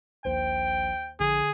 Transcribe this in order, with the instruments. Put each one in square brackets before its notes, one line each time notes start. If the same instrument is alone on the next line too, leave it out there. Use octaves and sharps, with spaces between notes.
[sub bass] A#1 [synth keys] D#2 C5 [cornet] G5
[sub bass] A#1 [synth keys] D3 [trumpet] G#4